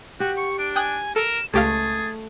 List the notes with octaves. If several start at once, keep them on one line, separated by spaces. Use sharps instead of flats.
F#4 G4 F#5
C#6
D4 D7
G5 G#5 D#6 F#6
A4 A#4 E7
C#2 A3 G4 G#4 F5 A6